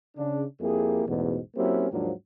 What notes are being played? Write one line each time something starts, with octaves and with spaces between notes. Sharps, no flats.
C#3 D4
F2 A#3 E4 G4 G#4
A1 E2 G#2 B2
F#3 A#3 C4 C#4 E4 G4
D#2 G#2 F3 F#3 A#3 D4